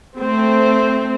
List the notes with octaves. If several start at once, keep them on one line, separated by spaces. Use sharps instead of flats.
A3 C4